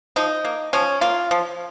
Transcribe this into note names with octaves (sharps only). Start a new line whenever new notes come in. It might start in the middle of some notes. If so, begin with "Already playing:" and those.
F3 D#4
A#3
F3 C#4
A#3 F4
F3